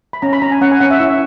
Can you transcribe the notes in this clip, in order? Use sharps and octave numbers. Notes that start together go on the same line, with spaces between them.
B5
C#4 A#5
B5
C#4 A#5
G#5
C#4 F#5
G#5
C#4 F#5
E5
E4